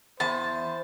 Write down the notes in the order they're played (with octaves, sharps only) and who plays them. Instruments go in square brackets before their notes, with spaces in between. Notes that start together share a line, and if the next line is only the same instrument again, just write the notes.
[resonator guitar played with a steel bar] E2 [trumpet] C5 [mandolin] A5